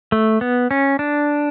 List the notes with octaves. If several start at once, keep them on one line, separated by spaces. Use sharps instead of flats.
A3
B3
C#4
D4